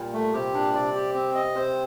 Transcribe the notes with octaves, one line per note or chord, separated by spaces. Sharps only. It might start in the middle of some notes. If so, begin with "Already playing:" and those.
Already playing: A#2 G3
A3
C3 G4
A#2 D4
C3 D5
G4
C4
D#5
C3 C5